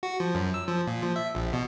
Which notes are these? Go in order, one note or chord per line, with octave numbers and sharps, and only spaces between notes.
F#4
F3
F#2
E6
F3
A#2
F3
E5
A#1
B2